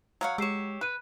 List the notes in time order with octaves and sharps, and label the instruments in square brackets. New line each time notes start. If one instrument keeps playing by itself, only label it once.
[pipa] F#3 [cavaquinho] C#5 F5 F#5
[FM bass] G#3 [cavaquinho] G4 C#5 [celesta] E6 C7 E7
[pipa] B4 [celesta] F#6 D#7